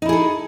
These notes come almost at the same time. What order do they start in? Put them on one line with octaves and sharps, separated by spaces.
D#4 E4 G#4 A4